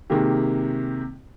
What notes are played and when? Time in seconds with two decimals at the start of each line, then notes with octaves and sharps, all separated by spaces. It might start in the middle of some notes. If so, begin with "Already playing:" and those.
0.10 C3 D#3 G#3 A#3 G4